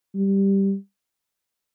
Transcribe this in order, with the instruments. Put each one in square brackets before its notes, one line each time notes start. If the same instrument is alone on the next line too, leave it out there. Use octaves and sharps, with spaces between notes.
[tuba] G3